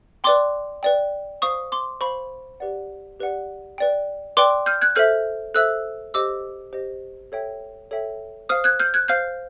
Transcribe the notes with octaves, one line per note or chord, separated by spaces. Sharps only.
B4 D5 G5 C6 D6
B4 D5 G5
C5 F5 C#6 D#6
C6 D6
C5 F5 B5 C#6
G4 B4 D5 F#5
G4 B4 D5 F#5
B4 D5 G5
B4 D5 G5 C6 D6
F6 G6
F#6 G#6
A4 C5 E5 F6 G6
A4 C5 E5 E6 F#6
G4 C5 D#5 D6 E6
G4 C5 D#5
A4 C#5 E5 G5
A4 C#5 E5 G5
C5 F5 D#6 F6
F#6 G#6
F6 G6
F#6 G#6
C5 F5 F6 G6